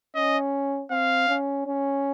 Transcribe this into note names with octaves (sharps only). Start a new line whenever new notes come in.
C#4 D#5
C4 F5
C#4
C#4